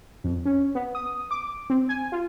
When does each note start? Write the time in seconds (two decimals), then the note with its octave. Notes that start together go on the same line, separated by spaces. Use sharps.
0.24 F2
0.45 C#4
0.75 B3
0.95 D#6
1.31 D6
1.70 C4
1.89 G#5
2.12 F4